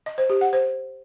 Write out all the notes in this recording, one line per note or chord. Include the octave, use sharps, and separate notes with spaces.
D#5
C5
G4
F#5
C5